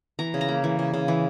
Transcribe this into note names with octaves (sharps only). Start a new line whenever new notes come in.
E3 A#5
C#3
A#5
A#3
E3
C#3
C#3
E3